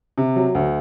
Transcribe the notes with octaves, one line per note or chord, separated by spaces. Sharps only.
C3
F#3
D2